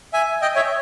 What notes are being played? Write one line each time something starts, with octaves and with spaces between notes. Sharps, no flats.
E5 G#5
D#5 G5
C#5 E5